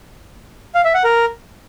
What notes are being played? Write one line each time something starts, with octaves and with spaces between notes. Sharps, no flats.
F5
E5
F#5
A#4